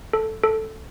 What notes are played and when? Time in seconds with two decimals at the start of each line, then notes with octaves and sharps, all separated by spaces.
0.13 A4
0.43 A4